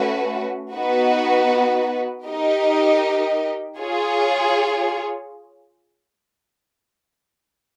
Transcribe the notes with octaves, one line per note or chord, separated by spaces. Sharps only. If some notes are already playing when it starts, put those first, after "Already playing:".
Already playing: A3 C#4 F#4 B4
B3 D#4 F#4 B4
D#4 G4 A#4 D#5
F4 G#4 C#5